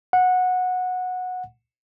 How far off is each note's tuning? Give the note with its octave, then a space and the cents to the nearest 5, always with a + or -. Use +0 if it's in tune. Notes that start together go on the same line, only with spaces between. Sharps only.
F#5 -15